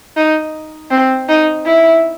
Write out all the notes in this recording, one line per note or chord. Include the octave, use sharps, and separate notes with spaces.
D#4
C4
D#4
E4